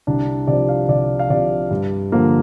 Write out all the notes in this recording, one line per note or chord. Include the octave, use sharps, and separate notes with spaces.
C2 D4
C3 F3 D5
F5
C2 D5
F5
C3 F3 D5
G2
D3 F3 A#3